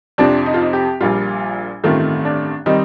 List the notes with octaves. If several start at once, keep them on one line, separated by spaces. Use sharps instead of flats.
F2 C3 F3 C4 D4
D#4
F4
D#4
G4
A#1 A#2 G3 F4
A1 G2 D#3 A3 C4 F4
D4
D#3 G3 C4 D#4